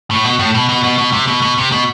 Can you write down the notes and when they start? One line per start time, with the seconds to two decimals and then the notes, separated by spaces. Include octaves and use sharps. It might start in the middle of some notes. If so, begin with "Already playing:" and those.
0.11 A2
0.24 B2
0.39 A2
0.55 B2
0.69 B2
0.84 B2
0.98 B2
1.13 C3
1.28 B2
1.42 B2
1.58 C3
1.72 B2